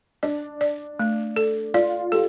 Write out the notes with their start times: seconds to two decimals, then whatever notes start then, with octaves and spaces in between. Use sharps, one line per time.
0.23 D4 D5
0.61 D5
0.99 A3
1.36 A4
1.74 F4 D5
2.12 G4 A4